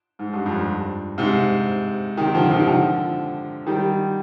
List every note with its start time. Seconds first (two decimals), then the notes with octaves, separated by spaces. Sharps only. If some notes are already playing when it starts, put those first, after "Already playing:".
0.19 G#2
0.33 G2
0.46 F2
0.58 G2
1.18 G#2 C3
2.17 C3 D#3
2.35 D3 F3
2.51 C3 D#3
2.67 D3 F3
3.66 D#3 G3